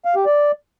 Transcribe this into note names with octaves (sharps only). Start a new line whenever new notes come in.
F5
G4
D5